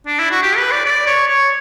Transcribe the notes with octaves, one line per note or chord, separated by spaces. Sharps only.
D4
E4
F#4
G4
B4
D5
D5
C#5
C#5